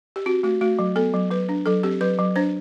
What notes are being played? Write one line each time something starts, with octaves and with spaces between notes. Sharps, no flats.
G4
C4 F#4
A3 F#4
A3 F#4
F#3
B3 A4
F#3
F#3 B4
D4
F#3 A4
C4 G4
F#3 B4
F#3
D4 C5